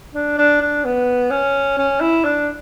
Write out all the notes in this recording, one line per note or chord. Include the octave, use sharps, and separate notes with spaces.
D4
D4
D4
B3
C#4
C#4
E4
D4